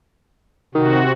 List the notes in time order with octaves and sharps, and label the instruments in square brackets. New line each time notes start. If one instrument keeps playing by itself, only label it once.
[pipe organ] C3 F#4 [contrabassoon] D#3